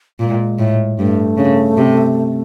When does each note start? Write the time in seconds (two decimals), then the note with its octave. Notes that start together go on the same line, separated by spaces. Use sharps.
0.20 A#2 G#3
0.59 A2
0.99 G2 A3
1.37 C#3
1.78 C3